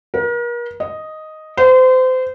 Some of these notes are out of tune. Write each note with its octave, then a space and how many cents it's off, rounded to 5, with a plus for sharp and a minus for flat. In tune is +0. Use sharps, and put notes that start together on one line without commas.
A#4 +40
D#5 +0
C5 -30